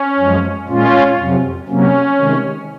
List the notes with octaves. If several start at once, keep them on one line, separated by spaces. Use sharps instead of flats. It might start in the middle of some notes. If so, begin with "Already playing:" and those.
Already playing: C#4
F#2 F3 G#3
A#2 G#3 C#4 F4
F2 C3 F#3
C3 F#3 A#3 C#4
C3 D#3 G#3